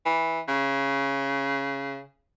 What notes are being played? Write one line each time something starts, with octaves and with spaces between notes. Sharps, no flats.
E3
C#3